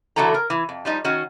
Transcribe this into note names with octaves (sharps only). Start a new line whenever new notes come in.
D3 E3 F#3 A3 A4 A#5
A#4
E3
F2
F3 G3 D#4
D#3 C#4 F#4